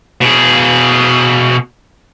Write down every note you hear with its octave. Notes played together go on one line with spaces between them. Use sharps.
B2 G#4